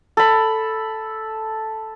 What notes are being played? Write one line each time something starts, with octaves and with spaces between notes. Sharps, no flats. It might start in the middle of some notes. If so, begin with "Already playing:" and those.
A4 B5